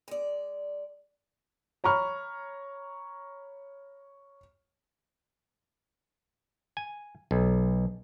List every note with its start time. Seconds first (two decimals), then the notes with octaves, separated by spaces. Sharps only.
0.08 G#3 D5
1.84 C#5 A#5 B5 C#6 F6
6.77 G#5
7.31 B1